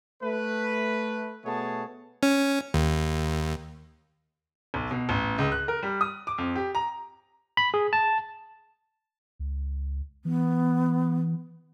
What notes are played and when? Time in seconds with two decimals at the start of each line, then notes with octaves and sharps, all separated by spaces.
0.22 A3 B4
1.45 B2 A3 B3 G#4 C#5 A5
2.23 C#4
2.74 D#2
4.74 B1
4.91 B2
5.09 A1
5.38 C#2
5.52 F#6
5.68 A#4
5.83 G3
6.01 D#6
6.27 D6
6.38 F2
6.56 G4
6.75 A#5
7.57 B5
7.74 G#4
7.93 A5
9.39 C#2
10.25 E3 B3